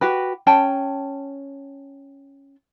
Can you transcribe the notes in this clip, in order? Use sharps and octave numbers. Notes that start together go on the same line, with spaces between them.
F#4 G4 B4
C#4 G5 A5